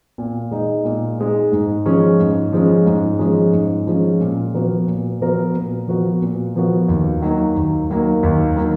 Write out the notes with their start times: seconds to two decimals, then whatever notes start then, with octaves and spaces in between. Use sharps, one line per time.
0.18 A#2
0.51 G#3 D#4
0.85 A#2
1.18 G#3 D#4
1.52 G#2
1.86 F3 G#3 C#4
2.20 G#2
2.53 F3 G#3 C#4
2.86 G#2
3.19 F3 G#3 C#4
3.53 G#2
3.87 F3 G#3 C#4
4.20 A#2
4.54 F3 B3 F#4 A#4
4.87 A#2
5.21 F3 B3 F#4 A#4
5.54 A#2
5.87 F3 B3 F#4 A#4
6.22 A#2
6.56 F3 B3 F#4 A#4
6.88 D#2
7.22 D#3 F#3 A#3
7.56 D#2
7.90 D#3 F#3 A#3
8.23 D#2
8.56 D#3 F#3 A#3